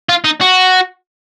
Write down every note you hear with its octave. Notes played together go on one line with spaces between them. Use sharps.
F4
D#4
F#4